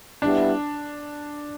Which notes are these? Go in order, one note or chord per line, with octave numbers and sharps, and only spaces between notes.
G3 B3 D4 E4 G4